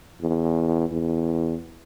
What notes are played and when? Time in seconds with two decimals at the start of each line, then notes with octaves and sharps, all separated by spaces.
0.21 E2
0.92 E2